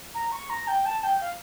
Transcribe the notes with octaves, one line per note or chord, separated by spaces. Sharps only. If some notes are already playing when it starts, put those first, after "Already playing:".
A#5
C#6
A#5
G5
A5
G5
F5